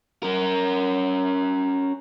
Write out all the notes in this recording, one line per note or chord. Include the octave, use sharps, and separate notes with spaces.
C#4 A#4